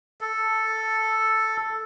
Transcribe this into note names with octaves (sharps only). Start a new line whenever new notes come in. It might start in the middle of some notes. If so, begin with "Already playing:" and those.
A4